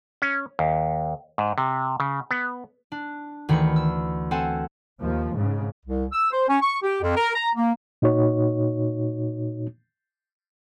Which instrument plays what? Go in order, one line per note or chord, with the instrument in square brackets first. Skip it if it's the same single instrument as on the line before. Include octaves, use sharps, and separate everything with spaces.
[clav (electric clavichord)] C#4
D#2
G#2
C3
C#3
B3
[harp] D4
D2 D#3 E3 B5 C#7
E6
C4 A4 F#5 G#5
[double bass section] D#2 F3
G#2 C#3
[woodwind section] C2
E6
C5
C#4
C#6
G4
F2
A#4
A#5
A#3
[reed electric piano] A#2 D#4 F#4 C#5